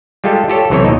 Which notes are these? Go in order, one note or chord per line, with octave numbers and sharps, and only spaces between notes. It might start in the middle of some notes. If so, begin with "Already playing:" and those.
G3 G#3 F4 G4 A4
F4 G4 A4 C#5
B1 C3 E3 E4 A4 C#5
D#2 A#2 D#4 D#5